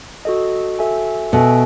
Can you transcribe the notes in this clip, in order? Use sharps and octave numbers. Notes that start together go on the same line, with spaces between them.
F#4 A4 D#5
F#4 A4 E5 G#5
B2 F#4 A4 E5 G#5